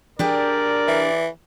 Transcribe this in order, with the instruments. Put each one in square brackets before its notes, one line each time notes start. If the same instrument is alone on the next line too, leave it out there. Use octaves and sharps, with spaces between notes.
[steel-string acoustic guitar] D4 G4 G#4 [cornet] A#4 [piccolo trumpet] D5
[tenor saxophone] E3